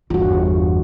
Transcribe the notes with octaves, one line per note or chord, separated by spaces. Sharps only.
G1 E2 F4 F#4